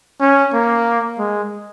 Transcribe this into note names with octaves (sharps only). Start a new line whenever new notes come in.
C#4
A#3
G#3